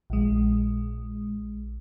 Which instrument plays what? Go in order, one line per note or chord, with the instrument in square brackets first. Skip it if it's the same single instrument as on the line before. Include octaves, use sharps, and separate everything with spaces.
[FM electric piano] A#1 G#3